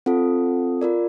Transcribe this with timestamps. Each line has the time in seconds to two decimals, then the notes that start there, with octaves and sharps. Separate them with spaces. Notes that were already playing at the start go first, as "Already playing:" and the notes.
0.06 C4 F4 A4
0.81 F4 A#4 D5